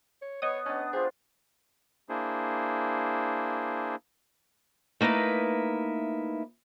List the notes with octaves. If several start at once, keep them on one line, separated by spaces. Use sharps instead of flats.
C#5
B3 C#5 D#5 D#6
B3 C#4 D4
F4 G4 G#4 C5
A#3 D4 E4 G#4 C5
A3 A#3 D#4 E4 B4